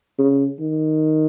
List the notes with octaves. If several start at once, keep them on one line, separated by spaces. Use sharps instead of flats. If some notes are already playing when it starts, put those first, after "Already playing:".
C#3
D#3